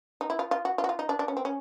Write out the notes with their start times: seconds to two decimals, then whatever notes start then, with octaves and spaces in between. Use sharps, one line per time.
0.21 D#4
0.30 E4
0.39 F4
0.51 F4
0.65 F#4
0.78 F4
0.84 F#4
0.89 F4
0.99 D#4
1.09 D4
1.19 D4
1.28 C#4
1.37 C4
1.45 C#4